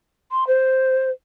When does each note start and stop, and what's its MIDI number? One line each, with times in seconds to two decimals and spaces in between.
0.31 0.44 84
0.47 1.10 72